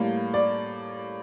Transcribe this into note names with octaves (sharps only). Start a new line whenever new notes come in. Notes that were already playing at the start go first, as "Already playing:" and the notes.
Already playing: A2 G3 A#3
D5